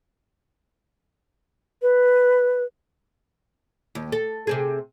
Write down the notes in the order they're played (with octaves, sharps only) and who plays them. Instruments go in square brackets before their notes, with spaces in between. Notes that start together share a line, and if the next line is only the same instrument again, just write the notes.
[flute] B4
[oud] D#2
A4
C3 C4 G#4